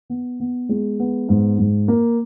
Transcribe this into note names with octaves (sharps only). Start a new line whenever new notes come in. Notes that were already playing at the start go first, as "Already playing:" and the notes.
B3
B3
G#3
B3
G#2
G#2
A#3